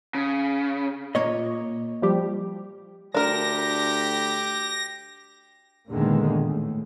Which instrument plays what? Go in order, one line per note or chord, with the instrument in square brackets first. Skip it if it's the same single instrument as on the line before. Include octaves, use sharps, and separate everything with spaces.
[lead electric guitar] C#3
[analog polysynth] A#2 [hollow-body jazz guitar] A#3 C#5 D#5
[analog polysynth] F3 G3 G4
[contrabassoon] D2 [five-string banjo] D4 A#4 [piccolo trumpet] G4 [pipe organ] A#6
[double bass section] E2 A#2 D3 D#3 G#3
A2